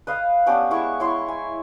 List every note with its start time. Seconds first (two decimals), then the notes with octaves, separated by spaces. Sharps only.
0.07 B4 D#5 F5
0.46 B3 C#4 D4 G4
0.71 G#3 E4 C#6
1.00 E4 C#5 C6 C#6
1.28 G#5